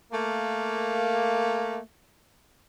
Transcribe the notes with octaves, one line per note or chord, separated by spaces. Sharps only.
A3 A#3